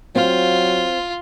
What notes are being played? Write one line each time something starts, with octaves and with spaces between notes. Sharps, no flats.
F#3 C4 F4 F5